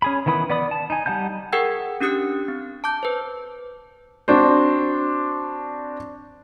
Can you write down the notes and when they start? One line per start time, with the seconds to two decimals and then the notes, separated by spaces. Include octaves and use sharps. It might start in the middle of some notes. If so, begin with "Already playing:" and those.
0.02 C#4 G#4 B5
0.26 D#3 E3 B3 B5 D#6
0.50 B3 D5 B5 D#6
0.71 A5
0.90 D#4 G#5
1.06 G3 D#4 F#5 A5 G6
1.52 G#4 A#4 F#5 G5 E6 G#6
2.00 C#4 D4 G4 D#6 F#6 C#7
2.48 C4
2.84 A5 D6 G6
3.03 B4 C5
4.28 C4 D4 F#4 C5